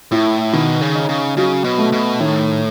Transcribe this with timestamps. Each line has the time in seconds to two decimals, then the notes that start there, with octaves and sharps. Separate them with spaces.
0.12 A2 E4
0.53 B2 D#3
0.81 C#3
0.95 D#4
1.09 C#3
1.37 C#3 F#3
1.64 B2
1.78 A3
1.92 B2
2.20 A2 D#3